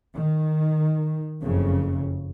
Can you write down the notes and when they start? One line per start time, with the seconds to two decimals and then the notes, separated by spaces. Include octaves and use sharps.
0.15 D#3
1.41 F#1 F2 C#3